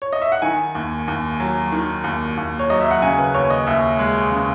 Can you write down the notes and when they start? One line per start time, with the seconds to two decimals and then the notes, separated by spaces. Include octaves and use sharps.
0.02 C#5
0.13 D#5
0.22 E5
0.32 F#5
0.42 D#3 G#5
0.75 D#2
1.08 D#2
1.40 F#3
1.72 D#3
2.04 D#2
2.37 D#2
2.59 C#5
2.70 F#3 D#5
2.81 E5
2.91 F#5
3.02 C#3 G#5
3.18 B4
3.34 D#2 C#5
3.50 D#5
3.67 D#2 E5
3.99 G#3
4.31 C#3